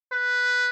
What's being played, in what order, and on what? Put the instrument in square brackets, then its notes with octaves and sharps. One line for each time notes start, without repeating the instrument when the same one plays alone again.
[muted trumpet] B4